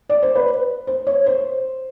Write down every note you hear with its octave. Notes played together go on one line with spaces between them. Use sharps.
D5
C5
B4
C5
C#5
C5